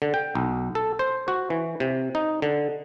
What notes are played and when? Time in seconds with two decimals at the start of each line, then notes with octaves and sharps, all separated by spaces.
0.02 D3
0.14 G5
0.35 B1
0.75 A4
0.99 C5
1.28 F#4
1.50 E3
1.80 C3
2.15 D#4
2.42 D3